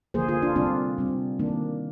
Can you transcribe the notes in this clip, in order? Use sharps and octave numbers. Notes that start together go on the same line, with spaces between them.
D3 F3 A#3 G#4 C5
F4 G#4
D4 F4
C3 G3 C4 D4 F4
C3 G3 C4
D#3 A#3 D4